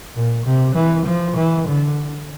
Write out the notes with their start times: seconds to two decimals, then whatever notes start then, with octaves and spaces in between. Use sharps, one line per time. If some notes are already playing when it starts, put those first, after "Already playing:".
0.16 A#2
0.46 C3
0.75 E3
1.06 F3
1.37 E3
1.68 D3